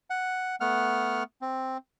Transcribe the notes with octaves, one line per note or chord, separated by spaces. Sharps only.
F#5
A3 B3 F#5 F6
C4